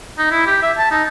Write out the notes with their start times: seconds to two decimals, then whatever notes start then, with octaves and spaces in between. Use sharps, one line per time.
0.18 D#4
0.31 E4
0.47 G4
0.62 E5
0.78 A5
0.91 D#4